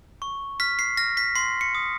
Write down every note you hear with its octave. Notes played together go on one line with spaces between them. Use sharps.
C#6
F6 B6
C7
F6 A#6
B6
C6 C7
C#7
D#6